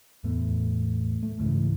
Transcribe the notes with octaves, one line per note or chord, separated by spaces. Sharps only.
E2 A2 A3 B3
A3
C#2 G#2 C#3 E3